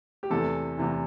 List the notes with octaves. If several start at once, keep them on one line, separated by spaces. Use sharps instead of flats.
G4
E2 C3 E3 A4
E2 C3 E3